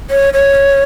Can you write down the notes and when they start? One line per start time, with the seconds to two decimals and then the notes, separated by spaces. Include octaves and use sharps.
0.10 C#5
0.34 C#5